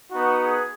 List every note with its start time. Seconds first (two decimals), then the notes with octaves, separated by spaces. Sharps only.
0.11 B3 D#4 F#4
0.45 G#4